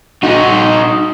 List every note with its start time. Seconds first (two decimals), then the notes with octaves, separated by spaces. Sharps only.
0.23 D#4 F#4